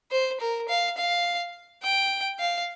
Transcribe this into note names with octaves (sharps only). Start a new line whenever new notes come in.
C5
A#4
F5
F5
G5
F5